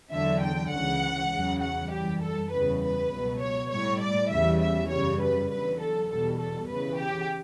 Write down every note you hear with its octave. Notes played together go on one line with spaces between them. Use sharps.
E2 D3 F#3 E5
G5
C#2 C#3 E3 F#5
E2 C#3 F#3
F#5
F#2 E3 G3 G4
A4
E2 C#3 G3 B4
B4
C#2 B2 F#3
C#5
A2 G3 C#5
D5
E2 C#3 E3 G3 E5
E5
F#2 C#3 G3 C#5
B4
E2 D3 F#3 B4
A4
E2 B2 G3 A4
A4
E2 C#3 E3 B4
G4